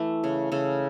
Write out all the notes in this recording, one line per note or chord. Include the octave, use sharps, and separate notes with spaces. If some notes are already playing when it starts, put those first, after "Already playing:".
Already playing: E3 A3
C#3
C#3 A4